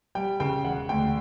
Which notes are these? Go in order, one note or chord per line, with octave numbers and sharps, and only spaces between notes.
G3 G5
C#3 G5
E1 F#5
D2 G5